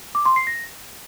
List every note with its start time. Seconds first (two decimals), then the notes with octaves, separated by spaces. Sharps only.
0.15 D6
0.26 C6
0.36 C7
0.47 A#6